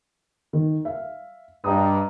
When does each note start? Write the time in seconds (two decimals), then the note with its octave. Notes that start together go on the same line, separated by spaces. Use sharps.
0.53 D#3
0.85 E5 F5
1.64 G2 D#5 A#5 D#6